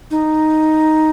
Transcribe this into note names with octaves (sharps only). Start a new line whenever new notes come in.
D#4